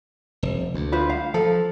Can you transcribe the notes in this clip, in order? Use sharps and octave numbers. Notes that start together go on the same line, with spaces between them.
F1
D2
F4 B4 C5
F5
F3 A4